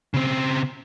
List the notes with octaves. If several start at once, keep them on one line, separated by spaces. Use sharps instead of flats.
C#3 C4